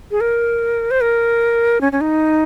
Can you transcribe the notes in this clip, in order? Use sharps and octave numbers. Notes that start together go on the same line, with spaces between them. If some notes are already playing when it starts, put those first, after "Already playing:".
G#4
A#4
C5
A#4
C#4
C#4
D#4